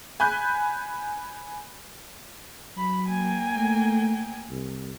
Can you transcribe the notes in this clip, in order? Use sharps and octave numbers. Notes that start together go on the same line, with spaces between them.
G#5 B5 F#6 G6
F#3 B5
A#3 G5 G#5
A3
C2